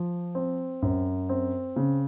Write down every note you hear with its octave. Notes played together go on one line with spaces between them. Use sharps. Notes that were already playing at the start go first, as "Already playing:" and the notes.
Already playing: F3
C4
F#2
C4
C#3